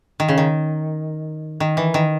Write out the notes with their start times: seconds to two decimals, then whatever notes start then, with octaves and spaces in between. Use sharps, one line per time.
0.20 D#3
0.28 C#3
0.38 D#3
1.60 D#3
1.77 E3
1.94 D#3